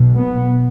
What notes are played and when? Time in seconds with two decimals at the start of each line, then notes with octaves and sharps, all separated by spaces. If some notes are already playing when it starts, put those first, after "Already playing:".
Already playing: B1 B2
0.16 B3